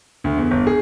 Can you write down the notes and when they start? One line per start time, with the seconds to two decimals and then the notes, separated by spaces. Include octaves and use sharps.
0.24 D2
0.38 E2
0.51 G1
0.67 G#4